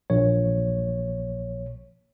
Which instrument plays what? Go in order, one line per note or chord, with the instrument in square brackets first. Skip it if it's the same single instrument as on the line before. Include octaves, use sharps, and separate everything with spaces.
[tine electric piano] A#1 C#5